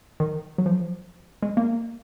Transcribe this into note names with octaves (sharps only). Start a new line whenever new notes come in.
D#3
F#3
F3
G#3
A#3